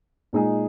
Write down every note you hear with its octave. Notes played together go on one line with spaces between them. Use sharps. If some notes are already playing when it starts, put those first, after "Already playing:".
A#2 G#3 D#4 G#4